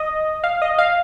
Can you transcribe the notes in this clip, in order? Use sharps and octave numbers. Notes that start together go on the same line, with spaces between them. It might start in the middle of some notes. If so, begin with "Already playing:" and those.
Already playing: D#5
F5
D#5
F5